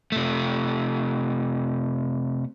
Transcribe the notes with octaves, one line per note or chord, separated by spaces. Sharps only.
C3 A3